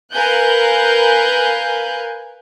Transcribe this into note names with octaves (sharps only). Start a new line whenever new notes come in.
A#4 B4 F5 G#5 F#6 G6